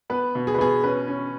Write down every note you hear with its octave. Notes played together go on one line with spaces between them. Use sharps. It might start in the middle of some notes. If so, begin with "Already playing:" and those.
B3 B4
B2
G#4
B4
B2 G#4
C#4 B4
C#4